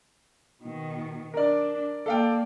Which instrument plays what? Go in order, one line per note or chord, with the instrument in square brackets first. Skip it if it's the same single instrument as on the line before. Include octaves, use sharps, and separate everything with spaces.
[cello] B2 D#3
[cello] D4 [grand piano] A#4 D5
[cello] A#3 D5 [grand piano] A4 F5 G5